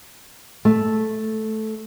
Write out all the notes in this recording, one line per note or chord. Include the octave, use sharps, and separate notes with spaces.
A3